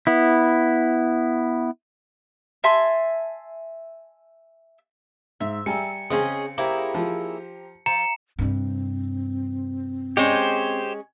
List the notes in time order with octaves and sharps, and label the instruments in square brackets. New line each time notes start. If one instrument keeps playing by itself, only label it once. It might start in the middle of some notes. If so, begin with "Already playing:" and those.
[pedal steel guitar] B3 E4
[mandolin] E5 G#5 A5 C6
[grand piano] G#2 [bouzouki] E5
[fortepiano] G3 [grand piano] G5 G#5 A#5 [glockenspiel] C#7
[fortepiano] C#3 C4 [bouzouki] C#4 G#4 D#5
[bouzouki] A#3 E4 G#4 [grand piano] G4 C5 A#5
[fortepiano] F3
[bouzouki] F3 [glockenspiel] A#5 C#7 E7
[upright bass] G2 C3 [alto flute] C4
[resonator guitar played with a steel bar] G#3 C#4 [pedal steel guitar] G4 C5